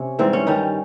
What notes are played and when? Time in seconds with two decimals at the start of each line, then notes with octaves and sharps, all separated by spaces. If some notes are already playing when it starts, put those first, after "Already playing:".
Already playing: C3 C#4
0.19 G#2 E3 G3 C4
0.33 C#4
0.47 G2 D#3 G3 D#4